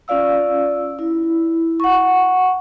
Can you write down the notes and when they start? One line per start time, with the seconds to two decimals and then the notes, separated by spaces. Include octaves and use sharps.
0.08 C#4 F4 D5 F5 E6
0.99 E4
1.80 F#5 C#6